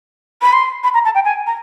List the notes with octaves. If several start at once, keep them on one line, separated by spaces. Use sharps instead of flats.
B5
C6
B5
A#5
A5
G5
G#5
A#5